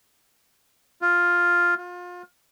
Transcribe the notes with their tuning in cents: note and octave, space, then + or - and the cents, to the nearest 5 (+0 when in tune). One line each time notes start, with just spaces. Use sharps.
F4 +5
F4 +30